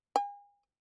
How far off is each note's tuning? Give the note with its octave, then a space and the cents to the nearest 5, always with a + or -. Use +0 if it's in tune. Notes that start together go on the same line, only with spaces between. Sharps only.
G#5 -40